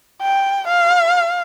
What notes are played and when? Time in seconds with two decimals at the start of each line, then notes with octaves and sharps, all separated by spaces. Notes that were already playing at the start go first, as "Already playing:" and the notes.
0.21 G5
0.67 F5